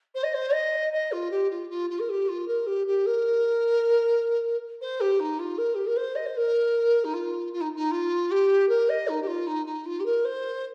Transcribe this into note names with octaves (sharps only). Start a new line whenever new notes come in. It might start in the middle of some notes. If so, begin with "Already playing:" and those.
C5
D#5
C5
D#5
D#5
F4
G4
F4
F4
F4
A#4
G4
F4
A#4
G4
G4
A#4
C5
G4
D#4
F4
A#4
G4
A#4
C5
D#5
C5
A#4
D#4
F4
F4
D#4
D#4
F4
G4
A#4
D#5
D#4
G4
F4
D#4
D#4
F4
G4
A#4
C5